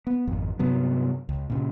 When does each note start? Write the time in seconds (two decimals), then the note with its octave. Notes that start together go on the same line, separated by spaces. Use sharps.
0.07 B3
0.27 G#1 F2
0.59 G2 C3 F#3 B3
1.29 C#2
1.50 A#2 C#3